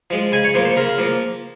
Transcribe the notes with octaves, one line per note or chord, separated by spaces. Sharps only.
F3 G#3
C#3 G#5
C#5
F3 A#3 C5
C5
C#3 A#4
F3 A#3